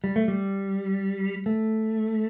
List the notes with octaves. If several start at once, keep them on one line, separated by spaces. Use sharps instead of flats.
G3
A3
G3
A3